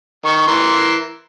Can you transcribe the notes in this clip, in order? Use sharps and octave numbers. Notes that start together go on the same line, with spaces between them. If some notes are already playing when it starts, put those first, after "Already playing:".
D#3 C#6
E3 A#4 C6